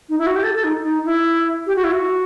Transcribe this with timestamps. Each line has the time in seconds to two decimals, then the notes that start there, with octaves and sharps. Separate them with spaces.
0.09 D#4
0.19 E4
0.27 F#4
0.36 G4
0.43 A4
0.54 A4
0.64 D#4
0.82 D#4
1.05 E4
1.67 G4
1.76 F#4
1.84 E4
1.92 F#4